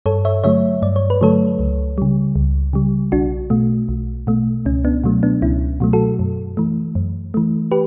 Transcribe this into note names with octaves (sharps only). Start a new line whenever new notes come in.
G2 A4 C#5
C#5 E5
D3 F#3 A3 C#5 E5
G2 D5
C#5
B4
D3 F#3 A3 A4 C#5
C#2
C#3 G3
C#2
C#3 G3
B1 D4 F#4
B2 A3
B1
B2 A3
C#2 C#4
B3 D4
B2 F#3 A3
B3 D4
C#2 C#4 E4
B2 F#3 A3
F#4 A4
F#2
E3 A3
F#2
E3 A3
G4 B4